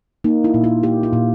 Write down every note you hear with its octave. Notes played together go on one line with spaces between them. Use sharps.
A#3 D#4
E4
A#2
F4
A#3 G4
F4
A#2